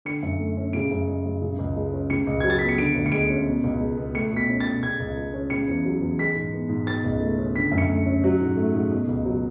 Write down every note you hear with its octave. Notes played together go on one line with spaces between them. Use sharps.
D3 C#7
F#2
A3
C#4
C#3 D7
F#2
G#3
F#2
C#3
C#2
G#3
C#4
C#3 C#7
C#2
F#3 G#6
A6
B3 B6
C#7
D3 D7
D2
C#7
G#3 D7
C#4
B2
C#2
G#3
B3
A3 C#7
B2 B6
C#4
B2 A6
C#3 G#6
C#2
G#3
C#4
C#3 C#7
E2
F#3
E2
G#3 B6
G#2
B3
G#2
B2 A6
C#2
A3
C#4
D3 B6
F#2
C#7
A3
C#4
F#3
G#2
A3
G#2
B2
C#2
F#3